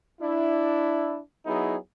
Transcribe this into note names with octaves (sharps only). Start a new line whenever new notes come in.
D4 E4
F#3 B3 D#4 E4 G#4